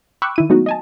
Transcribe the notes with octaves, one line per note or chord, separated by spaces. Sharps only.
G5 B5 C#6 D6 E6 F#6
D#3 E4 D#7
F#3 G#3 A3 B3 D#4 F#4
D#5 G#5 A5